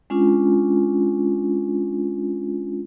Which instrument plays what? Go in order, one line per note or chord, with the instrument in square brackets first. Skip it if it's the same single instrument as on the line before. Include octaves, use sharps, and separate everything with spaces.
[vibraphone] G#3 C#4 D4 F4